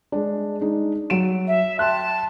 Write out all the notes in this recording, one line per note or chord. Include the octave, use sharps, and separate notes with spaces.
G#3 D4
G#3 D4 D#4
F#3 D7 E7
E5
G5 A5 C6 F#6